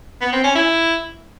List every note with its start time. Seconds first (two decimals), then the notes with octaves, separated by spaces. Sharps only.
0.21 B3
0.32 C4
0.44 C#4
0.55 E4